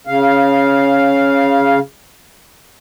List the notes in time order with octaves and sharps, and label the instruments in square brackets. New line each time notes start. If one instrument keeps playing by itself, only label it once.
[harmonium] C#3 F5